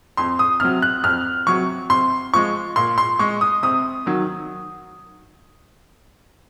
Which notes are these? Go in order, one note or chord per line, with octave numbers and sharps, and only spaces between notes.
F2 C6
D#6
C3 F#3 F6
F#6
F2 F6
C3 F#3 C#6
C3 C6
F3 G#3 C#6
A#2 C6
C6
G#3 C#6
D#6
C3 D#6
D#3 F#3